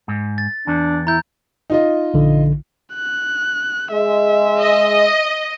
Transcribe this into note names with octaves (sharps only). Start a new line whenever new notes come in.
G#2
A6
E2 D4
E4 A#5 G6
D#4 F4 D#5
A#1 D3
F#6
G#3 E5
D#5